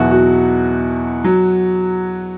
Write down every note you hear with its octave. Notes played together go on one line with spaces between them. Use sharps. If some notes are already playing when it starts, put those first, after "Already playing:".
Already playing: E2 B2 F#3 E4 F#4
F#4
F#3